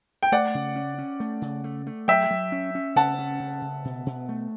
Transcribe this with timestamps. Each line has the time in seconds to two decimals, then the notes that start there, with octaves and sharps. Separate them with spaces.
0.23 G5
0.32 A3 D5 F#5
0.55 C#3
0.76 C#4
0.98 C#4
1.20 A3
1.42 C#3
1.64 A3
1.87 A3
2.08 F#3 E5 G5
2.30 F#3
2.52 C#4
2.75 C#4
2.96 C#3 F#5 A5
3.19 C#4
3.40 C#3
3.62 C#3
3.85 B2
4.06 B2
4.29 A3